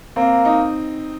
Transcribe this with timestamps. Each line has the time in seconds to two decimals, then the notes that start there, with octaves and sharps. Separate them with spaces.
0.16 A#3 C4
0.45 D#4